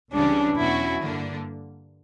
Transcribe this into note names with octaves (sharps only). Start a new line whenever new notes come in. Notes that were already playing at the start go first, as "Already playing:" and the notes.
C#2 C#3 E3 G3 C#4 D4
E2 B2 F#3 C#4 E4 F#4
G2 D3 A#3 D4